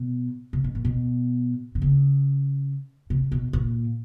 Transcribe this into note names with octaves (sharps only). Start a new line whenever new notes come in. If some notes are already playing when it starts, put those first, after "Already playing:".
Already playing: B2
C3
B2
A#2
B2
D3
C#3
C3
B2
A#2